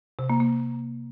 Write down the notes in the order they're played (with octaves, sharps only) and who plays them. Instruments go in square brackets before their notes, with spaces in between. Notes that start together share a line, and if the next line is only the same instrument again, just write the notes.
[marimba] C3
A#3
A#3